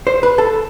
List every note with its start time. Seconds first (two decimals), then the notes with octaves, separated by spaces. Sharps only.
0.07 C5
0.23 B4
0.38 A4